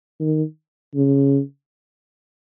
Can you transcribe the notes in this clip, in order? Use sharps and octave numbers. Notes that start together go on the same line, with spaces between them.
D#3
C#3